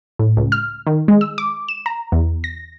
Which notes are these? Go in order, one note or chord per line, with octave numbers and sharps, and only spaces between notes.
A2
C#2
F6
D#3
G#3
E6
D6
E7
A#5
E2
A#6